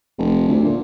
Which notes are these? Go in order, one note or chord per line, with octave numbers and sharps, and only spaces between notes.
F1
D2
A#2